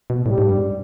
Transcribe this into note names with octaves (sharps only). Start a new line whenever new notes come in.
B2
A2 G3
G#2
G2